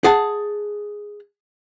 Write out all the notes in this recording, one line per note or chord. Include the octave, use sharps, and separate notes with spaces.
G#4 F#5 A5